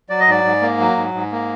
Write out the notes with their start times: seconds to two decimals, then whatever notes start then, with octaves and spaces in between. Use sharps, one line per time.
0.09 F#3 D5
0.20 D#5
0.28 G#2 D5
0.44 G#2
0.61 A#3
0.80 F#3
0.96 G#2
1.14 G#2
1.32 A#3